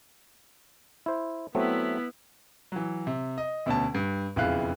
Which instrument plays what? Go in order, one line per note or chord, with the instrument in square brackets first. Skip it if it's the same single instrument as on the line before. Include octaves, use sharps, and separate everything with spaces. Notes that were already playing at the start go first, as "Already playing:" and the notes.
[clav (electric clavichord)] E4 C5
[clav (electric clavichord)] F#3 A3 C4 [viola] B3 E4
[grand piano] E3 F#3
C3
D#5
D2 B2 C#4 A5
G2
E1 F2 C#3 E4 F5 F#6